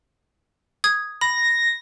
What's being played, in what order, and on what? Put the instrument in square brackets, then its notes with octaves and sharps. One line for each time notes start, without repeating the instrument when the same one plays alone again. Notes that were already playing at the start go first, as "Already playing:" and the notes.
[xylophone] D#6 G#6
[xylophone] B5 [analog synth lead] A#6